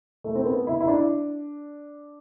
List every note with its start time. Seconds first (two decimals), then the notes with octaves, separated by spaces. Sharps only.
0.24 A3
0.35 C4
0.46 B3
0.67 E4
0.80 E4
0.88 D4